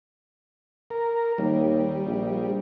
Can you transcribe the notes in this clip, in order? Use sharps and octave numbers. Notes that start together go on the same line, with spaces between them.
A#4
D#2 G3
A#1